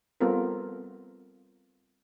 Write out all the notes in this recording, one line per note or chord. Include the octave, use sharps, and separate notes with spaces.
G3 B3 C4 F4 A4 A#4